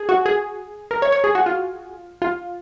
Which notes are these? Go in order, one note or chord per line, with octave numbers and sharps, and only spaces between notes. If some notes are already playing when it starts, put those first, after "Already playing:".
Already playing: G#4
F#4
G#4
A#4
C#5
C#5
G#4
F#4
F4
F4